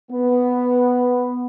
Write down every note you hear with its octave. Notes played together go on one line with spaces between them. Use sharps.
B3